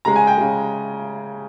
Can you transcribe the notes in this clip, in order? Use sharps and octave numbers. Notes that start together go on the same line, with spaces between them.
C#3 G#3 A#5
G#5
G5
C#3 G#3